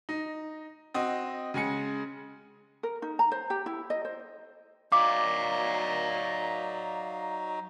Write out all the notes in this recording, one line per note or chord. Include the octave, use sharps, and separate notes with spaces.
D#4
C4 F#4 D#5
C#3 G#3 G#5 C#7
A#4
D#4
A#5
C5
G4
E4
D#5
C5
F#3 D#4 D5 F5 D6